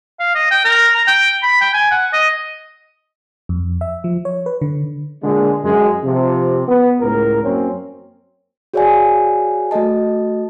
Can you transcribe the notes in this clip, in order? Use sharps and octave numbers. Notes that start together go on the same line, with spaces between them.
F5
D#5
G5
A#4
A#5
G5
B5
G5
G#5
F#5
D#5
F2
E5
F3
C#5
B4
D3
A#2 D3 G#3
F#2 G#3
C3 F3
B3
C#2 A2 A#4
F#2 A#3 C4 C#4
F#4 G#4 C#5 D5 F5 G#5
A3 F#4 A4 D#5 A5